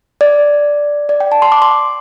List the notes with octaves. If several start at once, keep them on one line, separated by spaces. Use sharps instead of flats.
D5
D5
G5
A5
C6
D6
C6